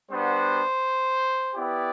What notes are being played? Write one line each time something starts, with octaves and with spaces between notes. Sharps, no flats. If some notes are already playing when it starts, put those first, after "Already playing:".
G3 B3 D4 F#4 C5
B3 E4 G4 D5